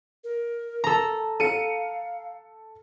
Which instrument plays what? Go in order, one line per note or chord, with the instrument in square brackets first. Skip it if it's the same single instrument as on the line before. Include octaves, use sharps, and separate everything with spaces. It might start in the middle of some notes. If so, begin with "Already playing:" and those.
[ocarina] A#4
[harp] A4 A#5
[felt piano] A4 C#7 [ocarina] F5 [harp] D#7